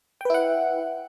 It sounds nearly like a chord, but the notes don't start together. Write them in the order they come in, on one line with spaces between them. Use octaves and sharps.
G5 B4 E4 F#5